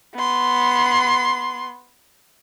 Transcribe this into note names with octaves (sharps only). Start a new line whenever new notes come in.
B3 C6